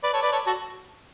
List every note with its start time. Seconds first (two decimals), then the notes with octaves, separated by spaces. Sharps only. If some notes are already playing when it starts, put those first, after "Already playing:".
0.03 B4 D5
0.13 A4 C#5
0.22 B4 D5
0.32 A4 C#5
0.46 F#4 A4